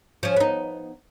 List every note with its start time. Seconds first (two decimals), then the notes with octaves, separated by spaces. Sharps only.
0.23 F3 C#4
0.36 B3 D#4